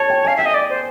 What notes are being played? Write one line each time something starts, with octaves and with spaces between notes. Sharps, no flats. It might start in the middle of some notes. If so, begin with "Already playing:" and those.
Already playing: C#5 A5
G5
F5 G#5
E5 G5
D#5
D5
C5